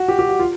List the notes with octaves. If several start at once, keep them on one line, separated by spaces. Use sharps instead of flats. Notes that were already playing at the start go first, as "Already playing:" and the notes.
Already playing: F#4
G4
G4
F#4
F4